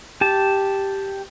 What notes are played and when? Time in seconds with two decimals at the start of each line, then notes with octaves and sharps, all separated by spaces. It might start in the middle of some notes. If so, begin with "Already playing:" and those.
0.21 G4 A5